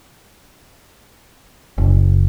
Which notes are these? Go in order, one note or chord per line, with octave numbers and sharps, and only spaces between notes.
F#1